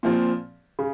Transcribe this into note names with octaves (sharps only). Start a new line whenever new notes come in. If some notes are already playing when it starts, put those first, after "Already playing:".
A#2 F3 C4
C#3